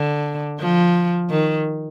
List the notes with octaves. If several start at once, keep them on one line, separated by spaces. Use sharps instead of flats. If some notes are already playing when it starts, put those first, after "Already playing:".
Already playing: D3
F3
D#3